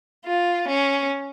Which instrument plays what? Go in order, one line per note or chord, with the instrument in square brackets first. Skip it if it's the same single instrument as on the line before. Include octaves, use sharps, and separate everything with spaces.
[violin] F4
C#4